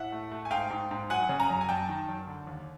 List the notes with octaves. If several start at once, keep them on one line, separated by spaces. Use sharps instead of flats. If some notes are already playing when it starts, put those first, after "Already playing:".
Already playing: A2 E5 F#5
A3
A3
G#5
G#2 F5 G5
G#2
G#2
F#3 F#5 G#5
C#3
G#5 A#5
F#2
G#5
F#2 G5 A5
D#3
F#2
D3
D#2